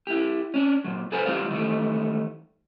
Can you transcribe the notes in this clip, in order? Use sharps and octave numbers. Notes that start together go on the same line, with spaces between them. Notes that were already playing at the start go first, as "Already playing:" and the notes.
E4 G4
C#4 D4
A#2 F#3
G#4 A4 B4 C5 G#5 A#5
E3 G3 F4 G4 D5 F5
D#3 E3 G3 A3